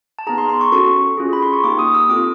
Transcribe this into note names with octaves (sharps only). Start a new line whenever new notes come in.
A5
B3 D#4 G#4 A#5
C6
C6
C#6
C#4 F#4 A4 C#6
C#4 F4 G#4
B5
C6
C#6
A#3 D#4 G4 D6
D#6
E6
C4 F4 A4 D6